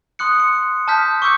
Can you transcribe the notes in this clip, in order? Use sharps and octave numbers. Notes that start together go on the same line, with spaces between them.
C6 D#6 F#6 C#7
C#7
A5 D#6 F6 G6 B6
C#6 D6 E6 G6 C#7